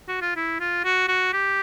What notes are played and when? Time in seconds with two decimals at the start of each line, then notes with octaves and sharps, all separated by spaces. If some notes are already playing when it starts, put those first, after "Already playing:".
0.08 F#4
0.22 F4
0.36 E4
0.60 F4
0.85 F#4
1.08 F#4
1.33 G4